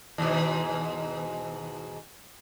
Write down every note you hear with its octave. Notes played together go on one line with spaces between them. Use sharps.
D#2 G#2 B2